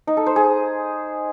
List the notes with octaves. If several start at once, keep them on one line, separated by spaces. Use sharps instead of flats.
D#4
A4
C5
G#4